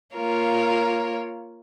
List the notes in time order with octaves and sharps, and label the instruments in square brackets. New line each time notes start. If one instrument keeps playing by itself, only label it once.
[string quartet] A#3 F4 A#4 C#5